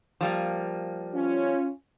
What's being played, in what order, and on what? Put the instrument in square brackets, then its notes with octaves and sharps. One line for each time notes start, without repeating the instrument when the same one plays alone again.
[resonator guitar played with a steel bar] F3 G3 A#3
[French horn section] C#4 F4